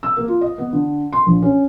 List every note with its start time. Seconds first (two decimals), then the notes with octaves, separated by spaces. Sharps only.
0.03 E6
0.17 A#3
0.28 F4
0.41 D#5
0.58 B3
0.73 D3
1.13 C6
1.26 A#1
1.42 C#4